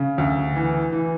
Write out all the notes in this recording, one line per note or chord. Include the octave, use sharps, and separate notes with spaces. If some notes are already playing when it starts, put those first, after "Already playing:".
Already playing: C#3
D2
E3
E3